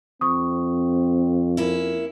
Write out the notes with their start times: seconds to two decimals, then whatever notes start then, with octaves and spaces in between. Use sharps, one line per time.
0.21 F2 C4 C#6 D#6
1.57 A#3 C#4 E4